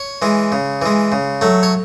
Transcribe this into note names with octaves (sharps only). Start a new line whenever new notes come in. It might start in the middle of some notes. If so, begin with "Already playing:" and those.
Already playing: C#5
E3 G#3
C#3
E3 G#3
C#3
F#3 A3
C#5